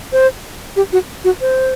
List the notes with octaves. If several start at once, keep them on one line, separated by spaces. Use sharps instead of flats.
C5
G4
F#4
F#4
C5